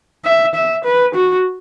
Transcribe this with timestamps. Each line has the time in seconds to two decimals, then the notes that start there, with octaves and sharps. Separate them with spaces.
0.25 E5
0.55 E5
0.85 B4
1.15 F#4